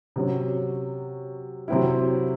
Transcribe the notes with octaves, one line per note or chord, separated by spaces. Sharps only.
C3 F#3 C#4
C3 F#3 C4 E4